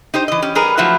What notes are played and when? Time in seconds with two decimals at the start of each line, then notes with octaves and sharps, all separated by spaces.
0.14 D#4 G4 C5
0.28 E3 D#5
0.42 C#4 G4
0.55 G3 G#4 A#4 B4
0.77 F3 F#3 A3 E4 F#4 B4